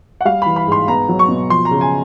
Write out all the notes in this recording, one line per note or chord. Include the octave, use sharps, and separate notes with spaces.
F#5
G3 F5
E3 B5
B5
G#2
C6
B3 A#5
F#3
C#6
B2
F3 C6
A#5
C#3
G#5